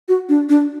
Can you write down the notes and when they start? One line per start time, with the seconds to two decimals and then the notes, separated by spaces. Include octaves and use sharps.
0.09 F#4
0.29 D4
0.49 D4